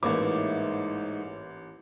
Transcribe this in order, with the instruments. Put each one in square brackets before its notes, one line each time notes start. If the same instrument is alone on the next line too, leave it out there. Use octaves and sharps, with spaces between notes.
[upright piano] A1 A#3 D6 [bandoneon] G#2 [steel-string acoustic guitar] E4 B4 C#5